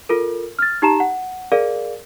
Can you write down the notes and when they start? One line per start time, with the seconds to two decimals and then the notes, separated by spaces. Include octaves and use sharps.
0.09 F4 A4 A#4
0.59 F6 A6
0.82 D#4 G4 A5 A#5 E7
1.00 F#5
1.52 G#4 A#4 D5 F5